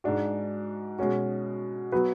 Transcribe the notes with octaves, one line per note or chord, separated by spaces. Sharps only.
G#2 G#3 D4 F#4
B2 G#3 C#4 F#4
F#3 B3 F#4 B4